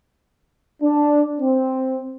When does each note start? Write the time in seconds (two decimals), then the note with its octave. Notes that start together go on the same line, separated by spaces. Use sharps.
0.81 D4
1.40 C4